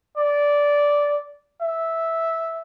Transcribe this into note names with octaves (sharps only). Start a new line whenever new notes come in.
D5
E5